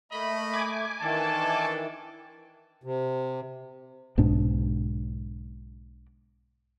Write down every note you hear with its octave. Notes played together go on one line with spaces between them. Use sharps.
A3 A#3 D#5 B5
G#5 D6
D#3 E3 D4 A4 A5
C3
B1 G#2 B2 D4